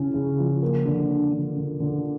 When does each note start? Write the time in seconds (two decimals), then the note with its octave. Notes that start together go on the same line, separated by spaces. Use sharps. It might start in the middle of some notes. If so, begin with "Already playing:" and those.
Already playing: C#3 C#4 E4
0.14 C#3
0.39 F3
0.62 A#3
0.85 D3
1.09 D4
1.32 D3
1.56 D3
1.80 D3